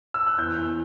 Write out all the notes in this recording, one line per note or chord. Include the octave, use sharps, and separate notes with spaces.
E6
F#6
E2 E6 G6
E2